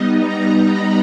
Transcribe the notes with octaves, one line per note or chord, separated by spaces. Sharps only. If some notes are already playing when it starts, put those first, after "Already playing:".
Already playing: G3 B3 D#4 D#5
A#5
B5